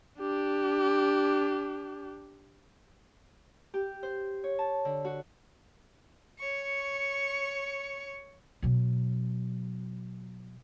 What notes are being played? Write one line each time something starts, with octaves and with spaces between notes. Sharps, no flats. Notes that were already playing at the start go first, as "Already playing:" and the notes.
D4 G4
G4
C5
C#5
A5
D3
F#4
C#5 C#6
B2 F#3